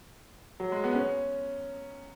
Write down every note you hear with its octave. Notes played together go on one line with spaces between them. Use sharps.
F#3
G#3
B3
C#4